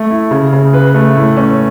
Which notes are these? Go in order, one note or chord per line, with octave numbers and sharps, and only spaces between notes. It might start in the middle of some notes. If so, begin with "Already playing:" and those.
Already playing: A3
E4
C#3
C#3
B4
A3
A2
C#4